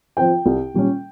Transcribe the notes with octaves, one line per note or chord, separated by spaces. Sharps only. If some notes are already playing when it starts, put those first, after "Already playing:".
F3 C4 G5
C2
A#2 G3 C#4